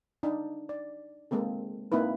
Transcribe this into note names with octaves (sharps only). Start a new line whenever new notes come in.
D4 D#4
D5
G#3 A#3 C4 A4
A#3 C4 D#4 E4 B4